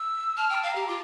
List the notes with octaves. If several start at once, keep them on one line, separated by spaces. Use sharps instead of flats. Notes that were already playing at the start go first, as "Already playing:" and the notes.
Already playing: E6
A5 F6
G5
A5
F5
G4 A#5
F4 D6